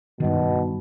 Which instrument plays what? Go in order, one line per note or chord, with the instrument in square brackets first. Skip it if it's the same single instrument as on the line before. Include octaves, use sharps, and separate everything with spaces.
[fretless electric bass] G2 D#3 [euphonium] B2